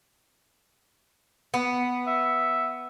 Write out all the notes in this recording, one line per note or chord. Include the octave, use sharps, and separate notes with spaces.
B3
E5